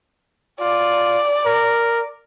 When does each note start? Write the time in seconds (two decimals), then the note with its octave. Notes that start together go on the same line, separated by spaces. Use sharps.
0.60 F4 D5
1.45 A#4